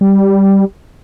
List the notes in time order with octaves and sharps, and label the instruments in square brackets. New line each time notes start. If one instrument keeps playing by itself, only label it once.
[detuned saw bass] G3